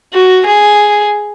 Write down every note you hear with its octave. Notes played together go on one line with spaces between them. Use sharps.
F#4
G#4